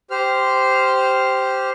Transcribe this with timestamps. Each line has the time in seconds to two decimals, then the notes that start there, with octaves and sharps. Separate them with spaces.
0.11 G4 C5 F6